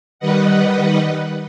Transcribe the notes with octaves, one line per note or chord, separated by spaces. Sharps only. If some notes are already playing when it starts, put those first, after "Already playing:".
D#3 G3 B4 D#5 F#5